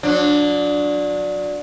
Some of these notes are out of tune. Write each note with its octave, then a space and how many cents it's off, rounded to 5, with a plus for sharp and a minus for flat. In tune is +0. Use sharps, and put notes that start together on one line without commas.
F#3 -35 D4 +0